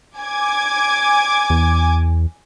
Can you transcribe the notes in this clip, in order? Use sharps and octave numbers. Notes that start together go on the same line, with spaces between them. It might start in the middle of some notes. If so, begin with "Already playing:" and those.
G#5 D6 G#6
E2